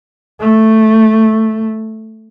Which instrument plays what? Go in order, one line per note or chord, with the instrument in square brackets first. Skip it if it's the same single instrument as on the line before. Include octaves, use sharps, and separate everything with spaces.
[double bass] A3